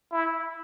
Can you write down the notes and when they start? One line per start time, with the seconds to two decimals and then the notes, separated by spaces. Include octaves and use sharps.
0.12 E4